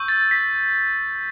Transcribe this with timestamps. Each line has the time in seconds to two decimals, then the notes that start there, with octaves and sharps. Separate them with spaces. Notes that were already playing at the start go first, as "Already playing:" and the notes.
Already playing: C#6 E6 G6
0.08 A6
0.31 B6